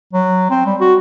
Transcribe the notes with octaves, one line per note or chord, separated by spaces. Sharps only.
F#3
C4
G3
F#4